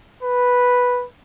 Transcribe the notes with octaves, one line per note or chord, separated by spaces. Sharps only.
B4